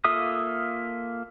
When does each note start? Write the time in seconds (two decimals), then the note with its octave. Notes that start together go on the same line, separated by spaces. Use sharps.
0.04 A#3 F4 A4 E5 D#6